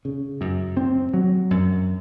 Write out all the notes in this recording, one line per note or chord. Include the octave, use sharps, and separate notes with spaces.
C#3
F#2
C4
F#3
F#2